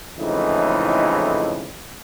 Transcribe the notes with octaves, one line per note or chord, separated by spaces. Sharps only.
F2 A2 C#3 E3 G#3 D#4